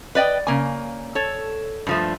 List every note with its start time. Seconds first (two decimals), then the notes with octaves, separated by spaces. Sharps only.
0.15 B4 D5 D#5 G5
0.47 C#3 A#3 G#5
1.15 A4 C#5
1.87 G2 F3 A3